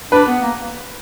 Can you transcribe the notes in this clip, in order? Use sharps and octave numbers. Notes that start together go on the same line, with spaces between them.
D4 B4
B3
A#3